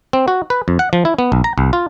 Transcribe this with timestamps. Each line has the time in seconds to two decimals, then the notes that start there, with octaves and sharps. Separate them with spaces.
0.13 C4
0.28 F#4
0.50 B4
0.68 F2
0.79 F#5
0.93 F3
1.05 E4
1.19 B3
1.32 B1
1.44 A#5
1.58 C2
1.73 F4